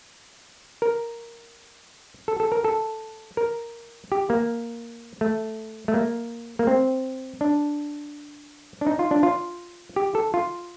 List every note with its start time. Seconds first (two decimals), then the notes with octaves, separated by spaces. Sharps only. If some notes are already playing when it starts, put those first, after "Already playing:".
0.82 A#4
2.28 A4
2.40 A4
2.52 A#4
2.65 A4
3.37 A#4
4.12 G4
4.30 A#3
5.21 A3
5.88 A3
5.94 A#3
6.59 A#3
6.67 C4
7.41 D4
8.81 D4
8.87 D#4
8.99 F4
9.11 D4
9.23 F4
9.96 G4
10.15 A4
10.34 F4